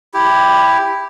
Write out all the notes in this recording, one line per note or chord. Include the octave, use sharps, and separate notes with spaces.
E4 G4